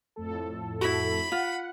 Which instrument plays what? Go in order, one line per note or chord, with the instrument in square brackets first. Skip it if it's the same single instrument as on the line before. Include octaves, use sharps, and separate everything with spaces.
[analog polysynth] F2 A2 A4
[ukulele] E4 F#4 [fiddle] B5
[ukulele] F4 [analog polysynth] F#5